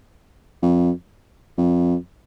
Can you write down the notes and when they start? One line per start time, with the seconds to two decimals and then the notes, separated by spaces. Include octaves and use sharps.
0.62 F2
1.57 F2